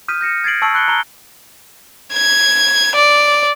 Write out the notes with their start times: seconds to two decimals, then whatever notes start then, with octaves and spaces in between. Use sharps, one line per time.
0.08 D#6 F6 G6 B6 D#7
0.21 G6 A#6 C#7 E7
0.44 G#6 A6 C7 D7 F#7
0.62 A5 C#6 E6 C7 D7 F#7
0.74 B5 E6 F#6 C7 C#7 G7
0.88 A#5 G7
2.14 G#6
2.95 D5